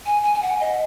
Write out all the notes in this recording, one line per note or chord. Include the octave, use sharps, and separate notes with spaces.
G#5
G#5
G#5
F#5
D#5